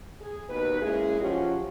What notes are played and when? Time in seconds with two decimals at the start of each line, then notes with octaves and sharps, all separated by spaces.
0.21 G#4
0.49 D#2 B2 D#4 B4
0.82 G#3 A#3 C#4 E4 G#4
1.21 F3 F#3 C#4 F4 G4